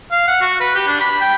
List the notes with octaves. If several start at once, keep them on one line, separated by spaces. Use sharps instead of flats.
F5
F#5
F#4
B4
G4
D4
B5
G5